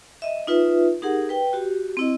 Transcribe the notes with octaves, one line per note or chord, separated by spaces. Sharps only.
D#5 E5
D#4 F4 B4 E5
D#4 G4 G#4 A#4 F#5
B4 G5
F#4 G4
C4 E4 D#5